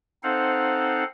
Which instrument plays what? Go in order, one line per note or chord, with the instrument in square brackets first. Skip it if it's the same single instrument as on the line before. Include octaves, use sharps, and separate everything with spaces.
[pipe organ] C4 D#4 A4 C5 F5 F#5